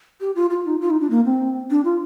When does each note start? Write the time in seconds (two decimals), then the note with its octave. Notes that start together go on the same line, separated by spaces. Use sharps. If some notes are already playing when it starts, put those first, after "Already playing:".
0.21 G4
0.36 F4
0.50 F4
0.66 D#4
0.81 F4
0.90 D#4
1.00 D4
1.10 A#3
1.25 C4
1.70 D4
1.85 F4